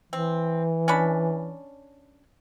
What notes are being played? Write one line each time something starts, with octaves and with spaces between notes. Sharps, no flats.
E3 C4
C#4 D4 B5